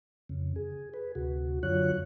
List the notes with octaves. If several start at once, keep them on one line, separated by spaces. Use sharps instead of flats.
F2 C#3
G#4
G#4 B4
D2 C3 F#4
F#2 D3 F#3 F4 C#5 F#6